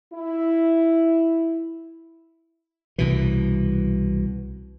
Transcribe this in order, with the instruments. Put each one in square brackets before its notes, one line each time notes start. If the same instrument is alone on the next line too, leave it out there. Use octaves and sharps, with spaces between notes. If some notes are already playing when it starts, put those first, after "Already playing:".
[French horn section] E4
[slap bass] C2 B2 E3